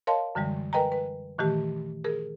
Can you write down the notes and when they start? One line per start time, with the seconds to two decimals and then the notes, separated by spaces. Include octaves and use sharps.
0.07 A#4 C#5 D#5 F5 A5 C6
0.35 F#2 D3 E3 G3 G#3
0.73 A#4 B4 D#5 G5 G#5 A#5
0.92 B4
1.38 A#2 D#3 E3 A3 G4 F6
2.04 G#4 A#4